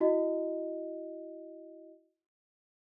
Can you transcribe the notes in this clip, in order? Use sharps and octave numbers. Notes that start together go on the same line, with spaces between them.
E4 F#4 D#5